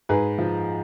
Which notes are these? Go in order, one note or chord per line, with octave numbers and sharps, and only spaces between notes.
G#2 G#4 B4
F3